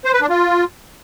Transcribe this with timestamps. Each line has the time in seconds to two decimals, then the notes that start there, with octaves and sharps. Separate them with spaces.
0.05 C5
0.13 B4
0.21 D4
0.30 F4